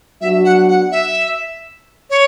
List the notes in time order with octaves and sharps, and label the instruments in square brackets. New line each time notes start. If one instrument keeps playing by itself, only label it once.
[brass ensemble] F#3 B3 D4 F#4 [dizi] E5
[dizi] F#5
F#5
E5
C#5